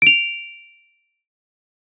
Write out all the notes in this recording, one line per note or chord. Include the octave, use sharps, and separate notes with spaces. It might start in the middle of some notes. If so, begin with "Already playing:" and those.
D7 F7